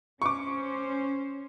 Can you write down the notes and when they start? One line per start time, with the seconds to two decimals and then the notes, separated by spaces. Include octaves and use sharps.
0.22 C#4 C5 C#6 D6